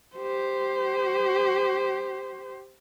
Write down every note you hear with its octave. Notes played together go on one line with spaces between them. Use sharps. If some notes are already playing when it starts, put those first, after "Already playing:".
G4 C5